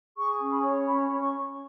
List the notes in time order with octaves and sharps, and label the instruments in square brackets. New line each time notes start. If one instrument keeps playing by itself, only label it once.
[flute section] G#4 C#6
C#4
B5
C#5
C#4 B5
C#4
C#6